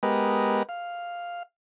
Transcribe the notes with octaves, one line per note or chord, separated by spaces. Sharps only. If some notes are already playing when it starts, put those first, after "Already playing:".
G#3 B3 G4 A#4 B4 D#5
F5